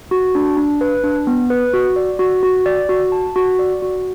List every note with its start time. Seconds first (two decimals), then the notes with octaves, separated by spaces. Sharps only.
0.11 F#4
0.35 D4
0.57 D4
0.81 B4
1.04 D4
1.27 B3
1.50 B4
1.74 F#4
1.96 D5
2.19 F#4
2.43 F#4
2.66 D5
2.89 F#4
3.12 A5
3.36 F#4
3.59 D5
3.82 F#4